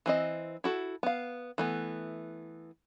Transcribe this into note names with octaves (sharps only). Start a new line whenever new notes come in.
E3 C4 D#5
E4 F#4 A4
B3 F5
E3 A3 B3